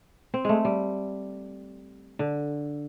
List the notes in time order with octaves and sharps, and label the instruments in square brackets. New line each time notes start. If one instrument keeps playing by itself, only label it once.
[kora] C4
G#3 A3
G3
D3